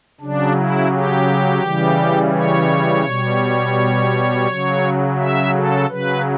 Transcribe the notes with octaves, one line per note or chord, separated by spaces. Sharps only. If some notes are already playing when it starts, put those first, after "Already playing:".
C#3 F#3 D4
E4
G4
C#3 E3 G3
C#5
B2 G3
C#3 F#3
E5
A4
C#3 F#3 B4